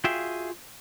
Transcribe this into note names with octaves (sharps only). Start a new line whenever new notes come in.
F4 F#4 G#4 E5 F5 G5